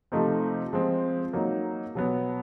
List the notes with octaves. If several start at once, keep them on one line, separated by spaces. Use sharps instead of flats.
C3 F3 A3 C4 D#4
F3 G#3 C4
F#3 A#3 D#4
B2 F#3 B3